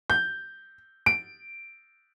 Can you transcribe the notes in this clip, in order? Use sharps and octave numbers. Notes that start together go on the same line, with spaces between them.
G6
D7